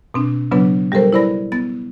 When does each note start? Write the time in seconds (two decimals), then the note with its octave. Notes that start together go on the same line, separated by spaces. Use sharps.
0.14 B2 C4 D4
0.51 C#3 F#3 B3 D4 B4
0.92 G3 G4 A4 A#4 C5
1.12 E4 B4 C5 D5 B5 A#6
1.52 B3 A6